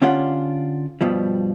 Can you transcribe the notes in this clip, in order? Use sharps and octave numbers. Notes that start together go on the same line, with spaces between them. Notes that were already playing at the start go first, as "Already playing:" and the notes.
D3 C#4 D4 F4 G4 F#5
G2 B2 F3 G3